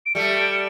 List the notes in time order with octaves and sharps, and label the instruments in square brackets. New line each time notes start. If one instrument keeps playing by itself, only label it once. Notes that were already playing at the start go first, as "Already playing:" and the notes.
[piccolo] D7
[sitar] G3 A3 [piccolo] C#7
[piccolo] D7
C#7